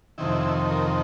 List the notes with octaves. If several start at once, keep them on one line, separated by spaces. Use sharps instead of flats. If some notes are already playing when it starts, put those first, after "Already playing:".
F2 C3 D#3 E4
A#4